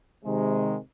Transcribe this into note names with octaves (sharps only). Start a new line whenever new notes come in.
C3 D#3 G#3